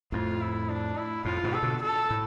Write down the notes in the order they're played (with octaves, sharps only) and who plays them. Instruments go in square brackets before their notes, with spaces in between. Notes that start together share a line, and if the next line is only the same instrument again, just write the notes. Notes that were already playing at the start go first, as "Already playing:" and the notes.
[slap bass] F2 A2 [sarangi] F4
[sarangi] E4
D4
E4
[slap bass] F2 A2 [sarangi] F4
[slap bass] G#2 B2
[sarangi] A4
[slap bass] B2 D3
[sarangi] A4
[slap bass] A2